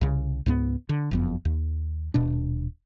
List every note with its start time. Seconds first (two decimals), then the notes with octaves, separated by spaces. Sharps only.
0.01 C2 C#3
0.46 C#2 G#2 F#3 B3
0.89 D3
1.11 F#1 F2 B3
1.45 D#2
2.14 D#1 B2 D4